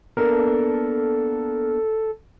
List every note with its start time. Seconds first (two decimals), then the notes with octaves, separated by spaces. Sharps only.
0.17 A#3 B3 D4 A4 A#4